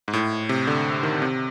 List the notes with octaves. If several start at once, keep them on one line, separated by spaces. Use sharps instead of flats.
G#2
A2
C3
D3
D#3
C3